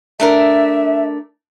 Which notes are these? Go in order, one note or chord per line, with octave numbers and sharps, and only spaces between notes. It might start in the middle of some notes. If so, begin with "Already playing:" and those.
A3 D4 A#4 E5